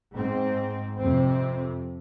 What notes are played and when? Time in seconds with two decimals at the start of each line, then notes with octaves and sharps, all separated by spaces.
0.15 G#2 C4
0.99 F2 C3 C4